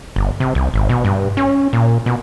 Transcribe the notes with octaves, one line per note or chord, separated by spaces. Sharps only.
G1
C3
C2
G#1
B2
G2
C#4
A#2
B2